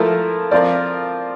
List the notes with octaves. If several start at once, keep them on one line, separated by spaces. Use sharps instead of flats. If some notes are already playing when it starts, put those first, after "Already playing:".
Already playing: F3 A3 E4 A#4
F3 C4 F4 A#4 D5